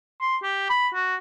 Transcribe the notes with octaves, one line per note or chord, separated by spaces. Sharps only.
C6
G4
B5
F#4